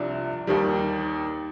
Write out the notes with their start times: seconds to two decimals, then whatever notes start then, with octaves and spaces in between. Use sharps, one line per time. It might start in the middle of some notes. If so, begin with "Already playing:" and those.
Already playing: C2 C3 F3 D4
0.47 D#2 D#3 G3